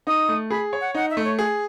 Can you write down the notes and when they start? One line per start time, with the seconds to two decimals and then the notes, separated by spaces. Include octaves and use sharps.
0.07 D#4 D#6
0.29 A3
0.50 G#4 B5
0.73 C#5
0.80 F#5
0.94 D#4 F#5
1.09 E5
1.17 A3
1.24 C#5
1.39 G#4